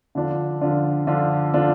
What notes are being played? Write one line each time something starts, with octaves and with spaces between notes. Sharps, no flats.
D3 F3 D4 F4
D3 F3 D4 F4
D3 F3 D4 F4
D3 F3 D4 F4